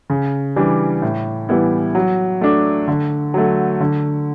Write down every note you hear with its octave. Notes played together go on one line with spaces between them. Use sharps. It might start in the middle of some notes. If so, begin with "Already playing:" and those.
C#3
E3 G3 D4
A2
E3 G3 B3 E4
F#3
A3 D4
D3
F#3 A3
D3